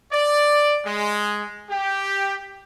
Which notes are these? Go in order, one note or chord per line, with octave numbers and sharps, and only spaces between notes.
D5
G#3
G4